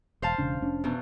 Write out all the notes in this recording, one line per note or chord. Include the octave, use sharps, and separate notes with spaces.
E1 C5 F5 A5
E1 C#3 D4
F1 C#4 D4
E2 B2